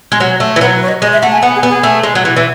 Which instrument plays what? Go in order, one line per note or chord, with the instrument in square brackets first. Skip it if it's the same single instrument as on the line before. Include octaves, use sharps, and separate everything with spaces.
[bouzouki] G#3
F#3
A3
E3
[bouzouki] F#3 [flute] B4
[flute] B4
C#5
D#5
[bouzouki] G#3 [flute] D#5
[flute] E5
[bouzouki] A3 [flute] F#5
[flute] G#5
[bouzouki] B3 [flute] F#5
[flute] G#4
[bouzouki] B3
[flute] G#4
[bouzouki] A3
G#3
F#3
E3
E3